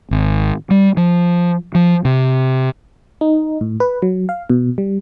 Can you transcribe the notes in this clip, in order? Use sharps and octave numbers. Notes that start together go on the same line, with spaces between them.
G#1
G3
F3
F3
C3
D#4
A2
B4
F#3
F5
B2
G3